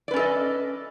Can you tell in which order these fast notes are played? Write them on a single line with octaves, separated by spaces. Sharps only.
D5 B4 C#4 A4 D#5